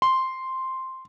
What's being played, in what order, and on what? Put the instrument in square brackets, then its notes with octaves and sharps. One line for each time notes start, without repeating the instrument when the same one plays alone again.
[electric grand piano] C6